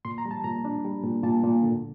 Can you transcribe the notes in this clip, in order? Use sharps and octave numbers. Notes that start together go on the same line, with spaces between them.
A#2 C6
A#5
G3
A5
A#2 A#5
D4
G3
A#2
A#2 A5
A#2
D3